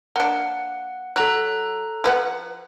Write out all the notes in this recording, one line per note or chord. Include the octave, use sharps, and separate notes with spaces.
A#3 D4 F#5
F#3 A4 A#5 F#6
F3 B4 F#5